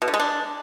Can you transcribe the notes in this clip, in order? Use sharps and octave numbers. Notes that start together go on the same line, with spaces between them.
B2
D3
G#3
D4